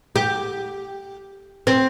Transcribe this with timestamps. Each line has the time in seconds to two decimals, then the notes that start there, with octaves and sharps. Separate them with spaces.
0.16 G4
1.67 C4